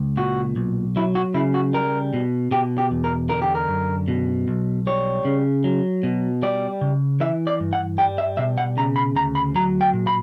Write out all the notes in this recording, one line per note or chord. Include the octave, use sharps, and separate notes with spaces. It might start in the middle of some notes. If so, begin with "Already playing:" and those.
Already playing: C#2
A#2 F#4
B1
F#3 E4
F#4
C#3 E4
F#4
G3 A#4
B2
B2 G4
G4
E2
A#4
D3 A#4
G4
A#4
F#2
B2
B1
G3 C#5
C#3
F#3
B2
G3 D5
C#3
E3 E5
D5
G2
F#5
G3 G5
E5
B2 E5
F#5
C#3 A#5
B5
D2 A#5
B5
F#3 A#5
G5
A#2
B5